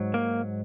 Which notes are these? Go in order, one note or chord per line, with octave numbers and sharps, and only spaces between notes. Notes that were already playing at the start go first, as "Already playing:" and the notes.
Already playing: G#2 F#3
A#3